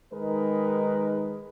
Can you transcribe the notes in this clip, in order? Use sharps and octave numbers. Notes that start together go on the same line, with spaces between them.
D#3 G#3 D#4 A#4 B4